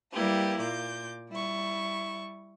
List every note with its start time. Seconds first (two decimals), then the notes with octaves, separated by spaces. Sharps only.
0.13 G3 A#3 E4 G4 B4
0.61 A#2 D6 G6
1.31 G3 E4 C#6